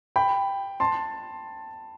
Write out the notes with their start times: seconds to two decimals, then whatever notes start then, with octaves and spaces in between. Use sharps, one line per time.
0.16 G5 B5
0.80 A5 C6